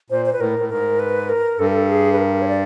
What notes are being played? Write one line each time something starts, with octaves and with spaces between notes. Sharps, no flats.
A#2 C5
C5
B4
A2 A#4
A2
G#2 A#4
B4
A#4
G2 A4
A#4
A4
G#4
B4
A#4
C#5
D5